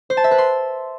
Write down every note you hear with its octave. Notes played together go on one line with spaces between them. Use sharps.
C5
A5
E5
B4
C6